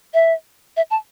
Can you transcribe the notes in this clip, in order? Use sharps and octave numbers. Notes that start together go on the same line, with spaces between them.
E5
E5
A5